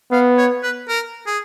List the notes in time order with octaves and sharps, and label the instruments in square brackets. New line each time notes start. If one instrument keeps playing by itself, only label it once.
[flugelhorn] B3 [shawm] F5
[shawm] C#5
B4
A#4
G#4